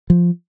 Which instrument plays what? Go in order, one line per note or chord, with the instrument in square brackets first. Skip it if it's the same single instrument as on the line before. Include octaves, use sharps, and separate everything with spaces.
[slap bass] F3